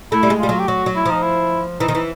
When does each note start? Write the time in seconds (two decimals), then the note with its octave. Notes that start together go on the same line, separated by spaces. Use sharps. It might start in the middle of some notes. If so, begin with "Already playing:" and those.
0.12 A3 E4
0.23 G3
0.30 G#3
0.40 G3 F4
0.49 F#3
0.60 G4
0.68 F#3 F#4
0.86 F#3
0.96 E4
1.06 F3 D#4
1.23 E4
1.80 E3 D#4
1.88 D#3
1.95 E3